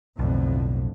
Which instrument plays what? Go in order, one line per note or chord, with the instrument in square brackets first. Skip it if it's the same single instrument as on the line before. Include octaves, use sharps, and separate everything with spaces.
[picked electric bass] B1 [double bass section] F2 A2 D3